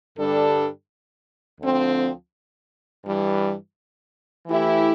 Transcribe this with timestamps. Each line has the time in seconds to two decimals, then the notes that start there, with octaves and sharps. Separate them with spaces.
0.17 G2 D3 G3 D4 A4
1.61 D2 D3 F3 C4
3.04 G2 E3 G3
4.47 E3 A3 E4 G4